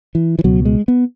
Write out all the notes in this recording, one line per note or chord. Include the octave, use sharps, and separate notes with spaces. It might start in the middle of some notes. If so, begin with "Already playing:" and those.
E3
E3
C#2 B2 F#3
G#3
B3